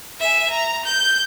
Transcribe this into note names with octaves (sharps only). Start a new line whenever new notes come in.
E5 G#5
A#5
G6